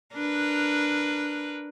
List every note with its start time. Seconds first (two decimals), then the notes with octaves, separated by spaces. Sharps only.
0.13 D4 A#4 B4